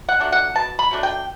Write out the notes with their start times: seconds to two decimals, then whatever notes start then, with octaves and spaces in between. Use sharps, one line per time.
0.09 F#5
0.20 F#3 A3 D4
0.32 F#5
0.55 B2 A5
0.79 B5
0.91 F#3 A3 D4
1.03 G5